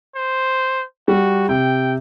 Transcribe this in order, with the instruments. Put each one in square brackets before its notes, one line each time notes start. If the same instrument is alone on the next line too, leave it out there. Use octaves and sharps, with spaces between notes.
[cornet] C5
[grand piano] G3 [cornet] F#4
[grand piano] C3 [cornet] G5